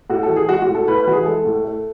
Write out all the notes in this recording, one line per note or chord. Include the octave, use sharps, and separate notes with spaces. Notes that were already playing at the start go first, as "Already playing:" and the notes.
A2 F#4
A4
E3
G#4
G#3 F#4
F#4
A2
A4
A2 B4
B4
E3 F#4
G#4
G#3 A4
A2
A3